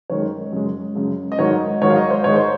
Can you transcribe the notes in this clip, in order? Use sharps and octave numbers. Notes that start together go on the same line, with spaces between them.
F#2 D#3 G#3 C#5
F#2 C#3 G#3
F#2 C#3 G#3
D#5
G#2 D#3 F#3 C#5
G#2 D#3 F#3 C#5
F5
D#5
C5
G#2 D#3 G#3 C#5
C5